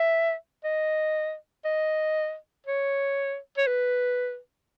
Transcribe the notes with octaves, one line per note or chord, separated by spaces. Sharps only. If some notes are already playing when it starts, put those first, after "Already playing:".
Already playing: E5
D#5
D#5
C#5
C#5
B4